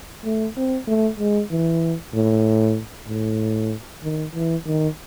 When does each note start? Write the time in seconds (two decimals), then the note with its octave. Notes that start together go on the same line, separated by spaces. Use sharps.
0.25 A3
0.57 C4
0.87 A3
1.19 G#3
1.51 E3
2.14 A2
3.08 A2
4.03 D#3
4.34 E3
4.66 D#3